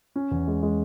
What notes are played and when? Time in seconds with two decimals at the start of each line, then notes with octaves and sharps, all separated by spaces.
0.16 C#4
0.31 E2
0.47 G#3
0.62 G#3